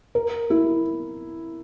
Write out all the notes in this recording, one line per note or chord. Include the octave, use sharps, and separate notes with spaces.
A#4
E4